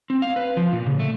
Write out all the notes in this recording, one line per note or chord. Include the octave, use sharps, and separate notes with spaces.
C4
F5
B4
F3
A#2
C#3
A3